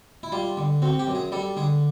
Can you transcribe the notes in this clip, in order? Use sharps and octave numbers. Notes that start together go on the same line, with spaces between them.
E4
G3 F4
D3
C4 F#4
G4
F#2
G#4
G3 A4
D3 G#4